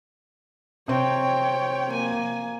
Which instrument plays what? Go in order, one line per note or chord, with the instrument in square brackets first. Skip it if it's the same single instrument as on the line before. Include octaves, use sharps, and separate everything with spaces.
[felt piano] C3 C4 [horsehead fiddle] C#5 G5
[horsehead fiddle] A#3 G#5